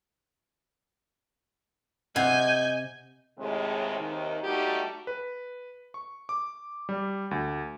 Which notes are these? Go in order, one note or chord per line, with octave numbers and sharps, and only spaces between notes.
C3 D#5 F#5 G#5 G6
D#2 A2 C3 G#3
D#2 C3 D#3
G3 A3 D#4 F#4 G4
B4
C#6
D6
G3
D2